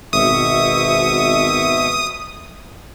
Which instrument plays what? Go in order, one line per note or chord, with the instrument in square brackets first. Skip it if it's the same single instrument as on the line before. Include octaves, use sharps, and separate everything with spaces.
[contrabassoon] G#1 [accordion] B2 E5 C#6 [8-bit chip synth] D#6